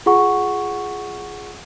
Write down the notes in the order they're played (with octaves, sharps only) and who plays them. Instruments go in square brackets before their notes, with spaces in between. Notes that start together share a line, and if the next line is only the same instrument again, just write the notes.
[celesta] F4 G#4 F#5 C#6